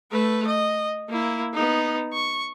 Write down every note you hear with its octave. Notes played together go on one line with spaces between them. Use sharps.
A3 B4
D#5
A#3 E4
B3 D#4
C#6